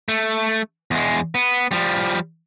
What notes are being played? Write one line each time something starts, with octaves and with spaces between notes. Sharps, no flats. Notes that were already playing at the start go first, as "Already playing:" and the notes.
A3
E2 G#3
B3
F3 G3